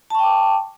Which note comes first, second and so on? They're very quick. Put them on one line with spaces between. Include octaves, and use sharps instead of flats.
A5 C#6 G5 D6